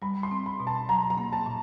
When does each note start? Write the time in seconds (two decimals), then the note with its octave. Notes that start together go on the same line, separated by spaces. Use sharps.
0.02 G3 B5
0.23 C6
0.31 C4
0.46 B5
0.60 B2
0.67 A5
0.89 F#3 A#5
1.10 A#5
1.18 A#3
1.33 A5
1.46 A#2